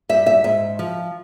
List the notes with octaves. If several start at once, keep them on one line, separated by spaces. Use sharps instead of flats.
G2 E5
E5
G#2 E5
F3